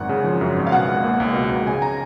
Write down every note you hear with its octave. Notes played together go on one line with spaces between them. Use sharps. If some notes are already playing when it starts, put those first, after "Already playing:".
Already playing: G#1 F#2 F#5
C#3
F3
F#2
G#1
F5
B2 F#5
C#2
A#3
C#2
B2
C#2
C#3 G#5
A#5